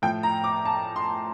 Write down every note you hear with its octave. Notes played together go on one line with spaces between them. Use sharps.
A2 F3 G5
A#5
D6
A5
C6